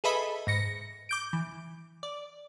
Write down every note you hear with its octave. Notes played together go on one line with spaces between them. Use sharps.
G#4 A4 B4 D#5 E5 B5
G#2 A#6 C#7
D6 G6 D7
E3
D5